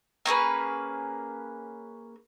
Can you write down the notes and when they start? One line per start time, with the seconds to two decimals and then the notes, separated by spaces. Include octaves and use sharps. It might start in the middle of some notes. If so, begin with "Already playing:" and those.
0.26 A#3 C#4 G#4 B4